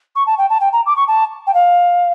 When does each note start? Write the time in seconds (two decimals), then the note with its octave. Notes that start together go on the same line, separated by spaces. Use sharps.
0.15 C#6
0.26 A5
0.38 G5
0.50 A5
0.60 G5
0.72 A#5
0.86 D6
0.96 C#6
1.07 A5
1.47 G5
1.54 F5